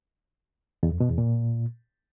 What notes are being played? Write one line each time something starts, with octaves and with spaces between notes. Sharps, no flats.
E2
F2
B2
E2
A#2